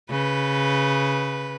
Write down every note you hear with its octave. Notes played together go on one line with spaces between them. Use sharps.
C#3 B4